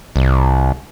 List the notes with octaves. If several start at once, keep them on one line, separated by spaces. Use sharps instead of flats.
C2